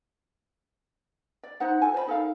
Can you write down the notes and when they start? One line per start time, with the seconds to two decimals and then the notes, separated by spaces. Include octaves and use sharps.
1.43 D5
1.60 D#4 C5 F#5
1.82 F4 A4 G#5
1.94 C5 D5 B5
2.07 D#4 A4 A#4 F5